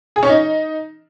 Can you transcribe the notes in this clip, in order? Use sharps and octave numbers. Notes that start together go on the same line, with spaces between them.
G#4
C#4
D#4